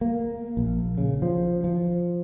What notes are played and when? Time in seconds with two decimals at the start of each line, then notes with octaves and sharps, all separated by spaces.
0.01 A#3
0.57 A#1
0.98 C#3
1.22 F3
1.64 F3